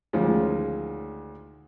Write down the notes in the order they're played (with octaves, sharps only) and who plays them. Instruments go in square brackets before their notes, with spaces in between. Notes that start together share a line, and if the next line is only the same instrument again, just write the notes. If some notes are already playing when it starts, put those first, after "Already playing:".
[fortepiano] D2 D#3 F3 G#3 C#4